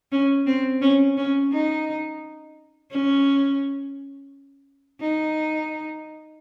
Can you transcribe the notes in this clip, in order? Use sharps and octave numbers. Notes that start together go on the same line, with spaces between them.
C#4
C4
C#4
C#4
D#4
C#4
D#4